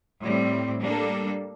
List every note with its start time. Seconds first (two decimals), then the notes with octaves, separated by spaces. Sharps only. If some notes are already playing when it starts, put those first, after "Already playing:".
0.22 A2 G3 C4
0.81 G3 A#3 D4 A4